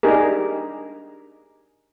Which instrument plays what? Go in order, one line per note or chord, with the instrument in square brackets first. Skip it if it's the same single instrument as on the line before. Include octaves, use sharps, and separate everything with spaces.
[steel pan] D4 D#4 G4 G#4 A#4